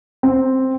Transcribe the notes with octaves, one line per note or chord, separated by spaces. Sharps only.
C4